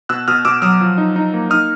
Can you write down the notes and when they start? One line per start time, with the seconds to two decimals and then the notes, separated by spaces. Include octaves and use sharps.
0.09 B2 E6 F#6
0.28 B2 D#6 F6
0.45 B2 D6 E6
0.62 F#3 D#6 F6
0.81 F3
0.98 D#4
1.16 D#4
1.33 A#3
1.50 D#4 D#6 F6